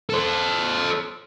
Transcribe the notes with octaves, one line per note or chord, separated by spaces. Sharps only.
A4 C5